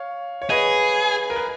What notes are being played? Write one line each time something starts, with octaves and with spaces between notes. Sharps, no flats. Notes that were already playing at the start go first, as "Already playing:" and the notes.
Already playing: C#5 F5
C#5
G#4 B4 D#5
A#4
B4